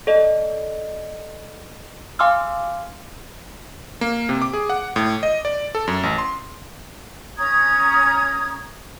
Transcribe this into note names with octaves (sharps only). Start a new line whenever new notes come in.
A4 D5 D#5
F5 G#5 C6 D6 E6 F6
A#3
C3
D6
G#4
F#5
A2
D#5
D5
A4
F#2
A1
C6
C#4 A#5 D#6 G#6